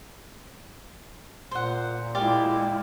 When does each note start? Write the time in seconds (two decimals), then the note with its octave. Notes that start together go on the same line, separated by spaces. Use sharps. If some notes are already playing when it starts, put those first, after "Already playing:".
1.51 A#2 C5 F#5
2.15 G#3 E4 G4 D5 F5